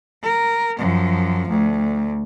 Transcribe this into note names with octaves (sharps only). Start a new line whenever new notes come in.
A#4
F#2 F3
D2